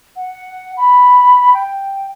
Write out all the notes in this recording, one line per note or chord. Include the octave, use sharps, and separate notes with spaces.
F#5
B5
G5